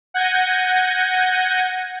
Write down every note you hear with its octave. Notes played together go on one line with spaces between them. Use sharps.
F#5 G6 G#6 A#6 D#7